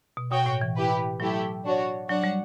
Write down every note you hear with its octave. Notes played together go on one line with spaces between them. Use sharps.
B2
B2 F#4 C#5 G5
A2
E3
E4 G4 B4
F#3 A3 E4 G4
D4 F#4 C#5
F#3 D4 F#4 C#5 F#5
G3